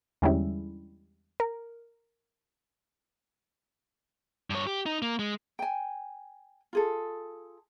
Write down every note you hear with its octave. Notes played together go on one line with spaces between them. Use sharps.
E2 D3 G3 G#3 C#4 E4
A#4
G2 C#5
G4
D#4
A#3
G#3
G5 G#5
F4 G#4 A4